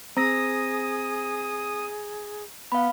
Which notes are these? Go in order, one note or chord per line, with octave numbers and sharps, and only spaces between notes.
C4 G#4 A#5 D#6 A#6
B3 F5 B5